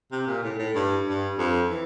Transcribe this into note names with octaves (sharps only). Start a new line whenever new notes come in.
C3
A#2
A2
A2
G2
G2
F2
E3